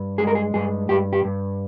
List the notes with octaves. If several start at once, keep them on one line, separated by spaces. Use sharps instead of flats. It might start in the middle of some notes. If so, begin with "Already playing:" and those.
Already playing: G2
G#3 G#4
A#4
G#4
G2 G#4
G2 G4
G4
G2